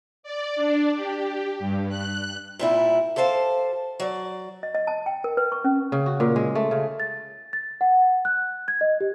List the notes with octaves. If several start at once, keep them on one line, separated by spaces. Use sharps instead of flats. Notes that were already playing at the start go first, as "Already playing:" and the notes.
D5
D4
G4
G2
F#6
A#2 G3 E4
G4 A4 C5 F5 A5
F#3 D5
D#5
D#5
A5
G5
A#4
B4
C#6
C#4
C#3
F#4
A#2
G#3
A3
C#3
A6
A6
F#5
F#6
G#6
D#5
G4